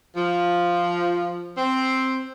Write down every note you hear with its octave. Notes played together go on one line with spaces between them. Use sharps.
F3
C4